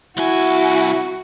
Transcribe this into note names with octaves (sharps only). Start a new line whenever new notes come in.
C2 E4 F#4 G#5